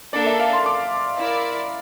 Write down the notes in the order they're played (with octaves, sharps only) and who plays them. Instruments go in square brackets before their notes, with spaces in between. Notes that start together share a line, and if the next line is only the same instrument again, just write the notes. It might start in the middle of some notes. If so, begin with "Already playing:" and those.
[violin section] A#3 D4 A4 [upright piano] D5
[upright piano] E5
F5
C6
D6
[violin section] E4 A#4 D5